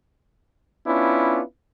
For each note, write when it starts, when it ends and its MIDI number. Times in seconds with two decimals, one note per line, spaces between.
0.87 1.41 59
0.87 1.41 61
0.87 1.41 62
0.87 1.41 64
0.87 1.41 65